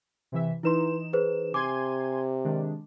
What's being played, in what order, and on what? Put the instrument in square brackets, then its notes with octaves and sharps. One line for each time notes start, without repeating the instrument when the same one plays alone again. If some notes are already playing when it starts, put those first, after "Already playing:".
[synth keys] C3 E3 E5
[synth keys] E3 D#4 E7 [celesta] E4 B4 C6
[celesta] G#4 B4 C5
[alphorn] C3 [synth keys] G#5 C6 G#6 [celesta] D6
[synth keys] D#3 G#3 D4